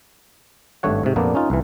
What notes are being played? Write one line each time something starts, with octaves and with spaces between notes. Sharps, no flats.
G#1 G2 A3 C#5 F#5
G#2 C3
F2 A#2 A#3 B3 D4
C#4 D#4 F4
C2 E3